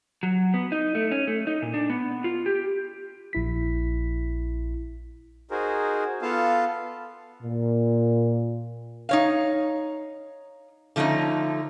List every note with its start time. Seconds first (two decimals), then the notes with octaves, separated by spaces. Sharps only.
0.23 F#3
0.54 B3
0.72 D#4
0.95 A3
1.12 C#4
1.27 A3
1.47 D#4
1.62 A#2
1.74 D4
1.90 B3
2.24 F4
2.46 G4
3.33 A#1 E4 B6
5.51 D#4 F#4 G#4 A#4 C5
6.22 B3 F4 A4 F5 A5
7.43 A#2
9.09 D#4 C#5 F5
10.96 D3 F3 A3 C#4 D#4